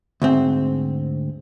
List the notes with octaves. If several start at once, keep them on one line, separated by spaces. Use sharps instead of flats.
D2 G#2 C4